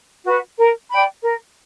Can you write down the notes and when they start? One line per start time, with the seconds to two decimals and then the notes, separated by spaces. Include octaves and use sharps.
0.24 F#4 B4
0.56 A#4
0.88 D5 G5 B5
1.22 A#4